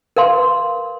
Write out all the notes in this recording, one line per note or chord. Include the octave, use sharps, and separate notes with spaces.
A#4 B4 F5 C6